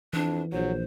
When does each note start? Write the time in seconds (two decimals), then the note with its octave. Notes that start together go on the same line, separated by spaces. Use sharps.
0.13 F2 E3 D4
0.52 A#1 F#3 C5